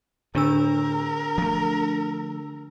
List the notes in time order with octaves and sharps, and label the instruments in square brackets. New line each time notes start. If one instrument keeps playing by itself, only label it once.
[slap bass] A2 [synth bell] D3 D4 E6 [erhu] A#4
[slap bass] F3 A3